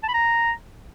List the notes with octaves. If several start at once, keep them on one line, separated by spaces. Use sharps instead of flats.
A5
B5
A#5